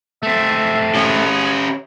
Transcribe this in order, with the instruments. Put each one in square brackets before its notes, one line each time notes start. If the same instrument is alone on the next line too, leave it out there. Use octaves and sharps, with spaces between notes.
[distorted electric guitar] A3 C4 [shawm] E5
[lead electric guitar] C#4 G4 [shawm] G#4